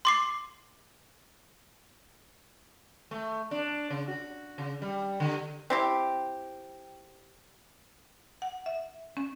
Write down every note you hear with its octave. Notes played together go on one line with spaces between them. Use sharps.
C6 D6 C7
A3
D4
C#3
F#4
C#3
G3
D3
C4 E4 G4
F#5
E5
C#4